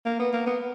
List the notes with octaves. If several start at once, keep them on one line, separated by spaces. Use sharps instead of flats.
A#3
B3
A#3
B3